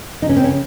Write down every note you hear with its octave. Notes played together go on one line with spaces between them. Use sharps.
C#3 D#4
C#4
C4
C#3 C#4